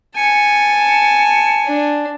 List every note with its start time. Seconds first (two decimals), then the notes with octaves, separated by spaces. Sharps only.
0.17 G#5 A5 C#7
1.66 D4